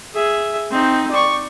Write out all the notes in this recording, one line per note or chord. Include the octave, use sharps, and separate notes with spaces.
G#4 E5
C4 D#4
D5 C#6